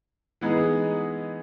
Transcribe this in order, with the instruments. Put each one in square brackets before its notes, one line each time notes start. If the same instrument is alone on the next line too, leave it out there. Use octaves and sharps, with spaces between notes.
[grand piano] E3 G#3 B3 D#4 G#4